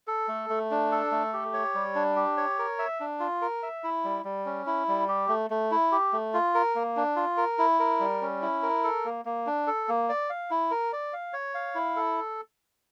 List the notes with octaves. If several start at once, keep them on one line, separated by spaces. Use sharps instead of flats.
A4
A3
A3
D4
A4
A3
G4
C#5
G3
D4
G4
C#5
A#4
E5
D4
F4
A#4
E5
E4
G3
G3
C#4
E4
G3
G4
A3
A3
E4
G4
A3
F4
A#4
A#3
D4
F4
A#4
E4
A#4
G3
C#4
E4
A#4
A4
A#3
A#3
D4
A4
A#3
D5
F5
E4
A#4
D5
F5
C#5
F5
E4
A4